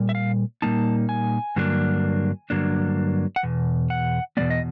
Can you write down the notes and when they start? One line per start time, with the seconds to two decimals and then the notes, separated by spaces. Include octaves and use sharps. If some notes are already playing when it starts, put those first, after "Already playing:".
Already playing: A#2 G3
0.09 E5
0.15 F5
0.62 A#2 G3 A#3 D#4 A5
1.09 G#5
1.56 G2 D3 F#3 A#3 D4
2.50 G2 D3 F#3 A#3 D4
3.36 F#5
3.43 E2 B2
3.90 F#5
4.37 E2 B2 G3 B3 D5
4.50 D#5